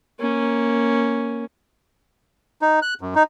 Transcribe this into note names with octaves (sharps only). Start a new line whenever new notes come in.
A#3 C#4
D#4
F#6
F#2
D#4